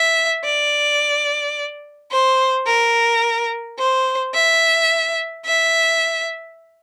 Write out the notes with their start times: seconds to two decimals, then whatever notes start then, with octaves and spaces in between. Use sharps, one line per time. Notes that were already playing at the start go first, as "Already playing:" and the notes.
Already playing: E5
0.44 D5
2.11 C5
2.66 A#4
3.78 C5
4.34 E5
5.45 E5